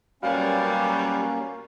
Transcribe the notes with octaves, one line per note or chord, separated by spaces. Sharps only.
F#2 B2 G3 A#3 C#4 F5